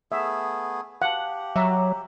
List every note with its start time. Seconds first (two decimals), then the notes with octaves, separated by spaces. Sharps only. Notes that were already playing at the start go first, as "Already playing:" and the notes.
0.12 A3 B3 G#4 E5
1.02 G4 F5 F#5 A5
1.56 F#3 E5 A#5 D6